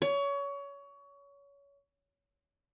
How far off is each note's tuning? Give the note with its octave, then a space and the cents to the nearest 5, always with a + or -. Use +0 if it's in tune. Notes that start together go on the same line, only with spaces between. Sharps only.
C#5 +25